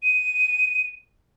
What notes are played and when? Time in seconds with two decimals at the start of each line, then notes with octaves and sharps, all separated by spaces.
0.03 D#7